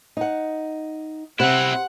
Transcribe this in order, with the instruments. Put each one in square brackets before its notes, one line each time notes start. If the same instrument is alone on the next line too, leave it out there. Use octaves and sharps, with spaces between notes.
[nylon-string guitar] D#4 F#5
[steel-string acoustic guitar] C3 [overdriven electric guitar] C4 E4 [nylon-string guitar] C5 [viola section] F#5